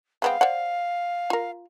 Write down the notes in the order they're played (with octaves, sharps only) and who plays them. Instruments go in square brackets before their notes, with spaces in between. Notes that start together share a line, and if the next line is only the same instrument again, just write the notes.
[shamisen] G#3 B3 C4 [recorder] F5
[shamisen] C5 D5 F#5
F4 A#4